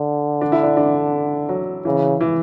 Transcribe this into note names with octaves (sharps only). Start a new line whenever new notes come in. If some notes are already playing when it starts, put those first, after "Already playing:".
Already playing: D3
D4
E4
D4
D4
F#3
C#3 E3
E3